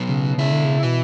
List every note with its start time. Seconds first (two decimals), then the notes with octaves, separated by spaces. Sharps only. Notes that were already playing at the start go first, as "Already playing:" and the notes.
Already playing: B2 F#3
0.09 C#3
0.38 C#3 E4
0.52 D3
0.64 C#3
0.83 B2 E3